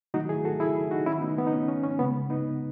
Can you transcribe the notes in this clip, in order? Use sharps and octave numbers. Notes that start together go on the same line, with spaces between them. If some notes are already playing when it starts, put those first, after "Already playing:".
D#3 F#3 A3 D#4 F#4
E4 G#4
F#4 A4
E4 G#4
D#4 F#4
D#3 A3 C#4 E4
B3 D#4
B3
D#4
C#4
C#4
C#4
C#3 G#3 B3
B3 D#4